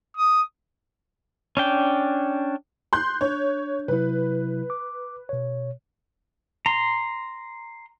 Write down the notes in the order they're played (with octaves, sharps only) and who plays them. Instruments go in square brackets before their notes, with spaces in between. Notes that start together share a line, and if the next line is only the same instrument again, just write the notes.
[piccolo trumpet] D#6
[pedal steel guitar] C#4 D4 G5
[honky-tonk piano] C6 F#6 G6
[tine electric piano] D4 [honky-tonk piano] C#5
[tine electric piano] C3 F#3 E4 [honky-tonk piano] B4
[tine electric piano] D6
B2 C#5
[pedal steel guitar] A#5 C6